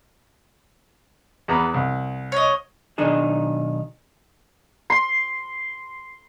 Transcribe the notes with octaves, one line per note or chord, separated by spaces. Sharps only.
E2 B3 A#5
C2
C#5 D#5
B1 D#3 D4 D#4 G#4
C6